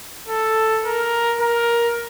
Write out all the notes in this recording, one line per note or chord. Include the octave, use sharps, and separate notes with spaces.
A4
A#4
A#4